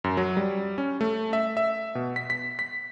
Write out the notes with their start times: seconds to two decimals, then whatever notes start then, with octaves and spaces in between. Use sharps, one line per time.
0.04 F#2
0.17 F#3
0.37 G3
0.78 C#4
1.01 A3
1.33 E5
1.57 E5
1.95 B2
2.16 B6
2.30 B6
2.59 B6